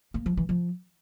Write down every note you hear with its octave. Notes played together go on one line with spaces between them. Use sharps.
A#3
F3
E3
F3